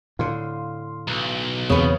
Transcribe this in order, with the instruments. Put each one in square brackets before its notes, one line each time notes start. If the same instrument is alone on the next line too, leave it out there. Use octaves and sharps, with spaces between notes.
[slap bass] A2 D3 [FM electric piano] F5 C6
[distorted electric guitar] B1
[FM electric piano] E2 C4 D#6 [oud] C#3 B3